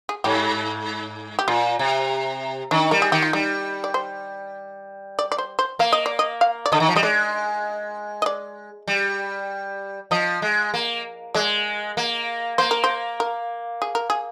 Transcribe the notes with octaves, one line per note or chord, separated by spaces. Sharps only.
G#4
G#2 G4
G4
A#2 F4
C3
D#3 D4
G3 A#4
G#4
D#3 G4
F4
G3 D#4
D5
C5
D5
D5
C5
C5
A#3 F5
D#5
D5
D#5
F5
D5
D3 D#5
D#3
F3
G3 D#5
G#3 D5
D#5
D5
G3
F3 D#5
G#3
A#3
G#3 D5
A#3
A#3 C5
A#4
C5
A#4
G#4
A#4
G#4